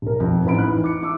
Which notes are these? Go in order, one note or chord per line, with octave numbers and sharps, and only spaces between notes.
B1 A#4
F2
A1 G#2 B4 B5 D7
E3 D#4 F#6
D6 C#7
E4 D6 E6